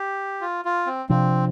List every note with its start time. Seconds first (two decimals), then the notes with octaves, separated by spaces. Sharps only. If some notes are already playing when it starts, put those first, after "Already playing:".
Already playing: G4
0.41 F4
0.65 F4
0.86 C4
1.09 C3 F3 C4 D4